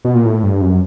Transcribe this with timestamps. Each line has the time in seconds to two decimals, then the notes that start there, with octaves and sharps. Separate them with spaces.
0.05 B2
0.15 A#2
0.26 A2
0.43 G2
0.61 F#2